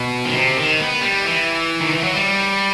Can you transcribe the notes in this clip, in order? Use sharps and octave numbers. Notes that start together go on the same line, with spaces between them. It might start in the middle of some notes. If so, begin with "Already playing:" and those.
Already playing: B2
D#3
C3
D#3
B3
G3
E3
D#3
E3
F#3
G3